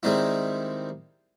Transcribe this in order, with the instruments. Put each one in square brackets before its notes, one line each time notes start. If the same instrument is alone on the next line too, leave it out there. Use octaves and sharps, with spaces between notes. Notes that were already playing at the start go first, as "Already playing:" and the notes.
[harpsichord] D#3 G3 G#3 C4 D#4 E4